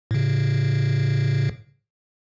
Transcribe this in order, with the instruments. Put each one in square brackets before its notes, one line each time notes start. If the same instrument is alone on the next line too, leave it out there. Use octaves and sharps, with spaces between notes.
[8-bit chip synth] A2 C#3